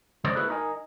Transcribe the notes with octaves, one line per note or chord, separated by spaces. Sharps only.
C#3 G#3 C5 D5 D#5
A#3 E4 F#4 G#4 A4 B4
D#4 A#4 C5 D#5 G#5